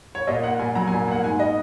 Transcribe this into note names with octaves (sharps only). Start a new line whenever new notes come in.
C#5
A#2 D#5
A#3 F#5
A#2 G#5
F#3 A#5
G#5
A#2
A#3 F#5
G#2 G#5
D#5